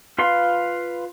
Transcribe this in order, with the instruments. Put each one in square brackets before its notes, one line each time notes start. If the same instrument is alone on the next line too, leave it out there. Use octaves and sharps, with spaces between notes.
[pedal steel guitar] F4 B4 F5 C6